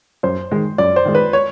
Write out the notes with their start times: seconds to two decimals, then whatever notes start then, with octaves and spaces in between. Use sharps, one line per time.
0.23 F#2 C5
0.51 D#3 G#3
0.78 F#2 D5
0.96 C5
1.05 D#3 G#3
1.15 B4
1.33 C#5